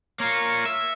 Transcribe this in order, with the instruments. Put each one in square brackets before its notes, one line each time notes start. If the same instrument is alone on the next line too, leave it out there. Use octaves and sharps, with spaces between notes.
[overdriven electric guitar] A#3 F4 [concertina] A#4 C#5 C#6
[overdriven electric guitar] E5